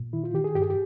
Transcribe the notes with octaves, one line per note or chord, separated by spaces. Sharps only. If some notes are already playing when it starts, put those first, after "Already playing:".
Already playing: A#2
D#3 E4
F4
D#3 G4
G#4
G2 G4
G#4
G4